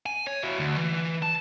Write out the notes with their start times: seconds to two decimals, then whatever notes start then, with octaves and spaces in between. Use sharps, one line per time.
0.06 G#5
0.27 C#5
0.43 E4 F#4
0.60 D2
0.77 E3
1.22 A5